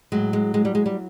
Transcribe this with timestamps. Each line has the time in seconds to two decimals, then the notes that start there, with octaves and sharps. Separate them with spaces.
0.12 A2 F#3 G#3
0.33 G#3
0.54 G#3
0.65 G3
0.75 G#3
0.86 G3